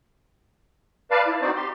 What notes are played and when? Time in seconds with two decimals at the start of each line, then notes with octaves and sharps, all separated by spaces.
1.11 B4 D5 F5 A5
1.27 E4
1.42 C4 D#4 F#4 C5 D5
1.56 G4 C6